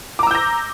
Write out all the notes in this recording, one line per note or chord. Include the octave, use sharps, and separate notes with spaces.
A#5 D6 E6 G6 A#6